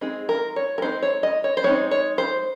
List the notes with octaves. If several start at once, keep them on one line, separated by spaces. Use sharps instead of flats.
G#3 C4 D#4 G#4
A#4
C#5
A#4
G#3 C4 D#4 C5
C#5
D#5
C#5
C5
G#3 C4 D#4 C#5
C#5
C5